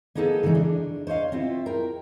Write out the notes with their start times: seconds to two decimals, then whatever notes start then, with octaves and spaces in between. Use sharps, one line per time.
0.15 A#3 B3 D#4 G#4 A4
0.43 C#3 E3 G#3 C#4 D#4
0.55 D4
1.07 C5 C#5 D#5 F5
1.32 C4 E4 F4
1.66 A#4 G5